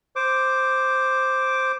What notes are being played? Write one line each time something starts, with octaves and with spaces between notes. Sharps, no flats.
C5 D6